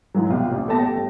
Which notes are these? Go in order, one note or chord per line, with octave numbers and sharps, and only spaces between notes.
G#2 E3 F#3
C2 B2 F4 G4
A1 A#2
A3 B3 G4 A5 A#6
G4
G1